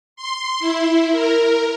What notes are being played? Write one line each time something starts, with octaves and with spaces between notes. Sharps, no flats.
C6
E4
A#4